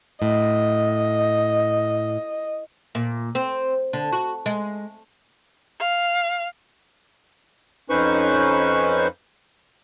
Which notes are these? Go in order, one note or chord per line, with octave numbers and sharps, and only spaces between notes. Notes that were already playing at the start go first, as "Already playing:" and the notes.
A2 D#5
A#2
C4
D3
F#4
G#3
F5
F2 C#4 D#4 B4 C5 C#6